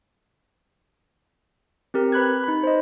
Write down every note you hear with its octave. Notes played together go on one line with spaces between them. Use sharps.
C4 G4 A#4
B4 B5 F#6 G#6
D#4 B5
C5 D#5